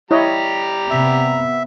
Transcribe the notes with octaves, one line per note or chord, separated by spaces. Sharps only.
G3 E4 G4 C#5 D#5 A#5
C3 B3 E5